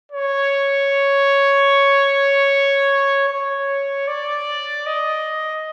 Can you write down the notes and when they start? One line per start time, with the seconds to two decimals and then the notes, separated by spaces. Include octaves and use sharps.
0.12 C#5
3.28 C#5
4.07 D5
4.86 D#5